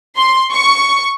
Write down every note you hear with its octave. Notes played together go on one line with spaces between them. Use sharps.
C6
C#6